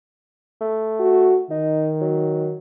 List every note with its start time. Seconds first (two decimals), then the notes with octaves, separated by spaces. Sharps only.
0.61 A3
1.00 F#4
1.51 D#3 D#4
2.01 F#3